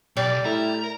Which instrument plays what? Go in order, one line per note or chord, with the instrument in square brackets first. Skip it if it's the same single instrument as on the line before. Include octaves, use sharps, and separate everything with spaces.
[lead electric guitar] B1 [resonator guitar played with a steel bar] G3 [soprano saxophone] D5
[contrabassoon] A2 [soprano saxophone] E4 [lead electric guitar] A#5
[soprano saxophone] A#4